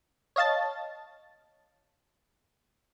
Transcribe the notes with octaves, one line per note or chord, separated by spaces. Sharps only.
C#5 D#5 F5 A5 A6